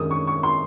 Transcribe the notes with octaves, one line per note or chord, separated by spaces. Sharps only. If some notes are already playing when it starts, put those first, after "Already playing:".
Already playing: F#2 D#3 G#3 D#6
C#6
C#6
C6